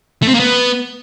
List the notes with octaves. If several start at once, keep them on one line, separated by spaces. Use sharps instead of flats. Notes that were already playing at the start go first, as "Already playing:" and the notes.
A3
C4
A#3
B3